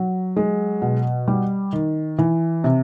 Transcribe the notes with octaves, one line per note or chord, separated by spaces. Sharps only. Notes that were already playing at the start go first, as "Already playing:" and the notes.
Already playing: F#3
G#3
B2
G3
D#3
E3
C3